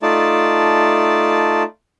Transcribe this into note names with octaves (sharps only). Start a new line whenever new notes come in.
A3 D#4 F4 D5 A5